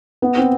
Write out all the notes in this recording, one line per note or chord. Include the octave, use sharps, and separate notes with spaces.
B3
C4